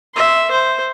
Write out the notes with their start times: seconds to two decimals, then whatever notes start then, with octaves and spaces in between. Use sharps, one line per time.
0.14 E5 C6
0.51 C5